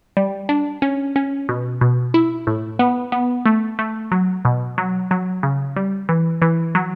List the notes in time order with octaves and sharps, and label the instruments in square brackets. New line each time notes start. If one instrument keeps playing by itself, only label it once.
[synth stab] G3
D4
C#4
C#4
B2
B2
E4
A2
B3
B3
A3
A3
F#3
B2
F#3
F#3
C#3
G3
E3
E3
F#3